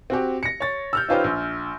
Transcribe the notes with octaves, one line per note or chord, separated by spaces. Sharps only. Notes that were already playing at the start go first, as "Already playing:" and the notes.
C4 F#4 G4
A#6 C#7
C#5 A6
E6 F6 G6
C#4 D#4 F4 G4 B4 C5
A#1